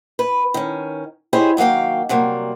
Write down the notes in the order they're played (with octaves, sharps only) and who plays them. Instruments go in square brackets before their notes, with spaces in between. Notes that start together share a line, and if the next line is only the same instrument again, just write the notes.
[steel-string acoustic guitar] B4
D#3 C#4
E4 G4 G#4 C5 C#5 D#5
D#3 F#3 A#3 F5 G5
C3 F#3 G3 A#3